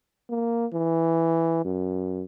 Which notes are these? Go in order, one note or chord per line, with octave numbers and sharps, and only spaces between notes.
A#3
E3
F#2